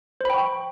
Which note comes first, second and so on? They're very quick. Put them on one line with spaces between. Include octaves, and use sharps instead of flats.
C5 B5 G5 C#6